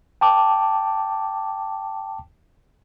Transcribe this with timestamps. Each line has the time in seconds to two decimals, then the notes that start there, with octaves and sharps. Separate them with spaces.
0.21 G5 A5 D6